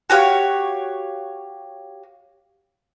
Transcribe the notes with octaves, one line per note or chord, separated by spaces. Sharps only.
F#4 G4 C#5 F5